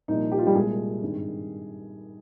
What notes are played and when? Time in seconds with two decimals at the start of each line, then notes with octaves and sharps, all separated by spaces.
0.08 C2 A#2 F3 D#4
0.32 G4
0.39 F4
0.47 G3 G4
0.55 C2 A#2 G#3 G#4
1.02 G#1 G2 D#3